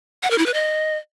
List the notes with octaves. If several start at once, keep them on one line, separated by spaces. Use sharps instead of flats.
F#5
A#4
E4
B4
D#5